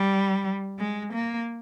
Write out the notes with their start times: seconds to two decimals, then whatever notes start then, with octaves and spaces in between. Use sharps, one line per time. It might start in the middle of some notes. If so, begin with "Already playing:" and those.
Already playing: G3
0.79 G#3
1.13 A#3